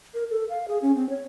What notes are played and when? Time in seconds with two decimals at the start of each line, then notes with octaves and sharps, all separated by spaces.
0.14 A#4
0.30 A4
0.50 F5
0.68 G#4
0.82 C#4
0.96 C4
1.10 C#5